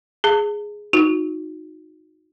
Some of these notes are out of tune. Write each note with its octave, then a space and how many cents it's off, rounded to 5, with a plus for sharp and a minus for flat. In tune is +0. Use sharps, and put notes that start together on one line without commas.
G#4 +0 A5 +35
D#4 +0 F#4 -30